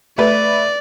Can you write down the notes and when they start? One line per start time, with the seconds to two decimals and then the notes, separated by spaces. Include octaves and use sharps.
0.18 A3 B4 D5